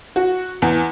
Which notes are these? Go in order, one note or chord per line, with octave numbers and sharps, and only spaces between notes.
F#4
E2